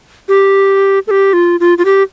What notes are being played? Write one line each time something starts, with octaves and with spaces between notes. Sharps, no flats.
G4
A4
G4
F4
F4
F4
G4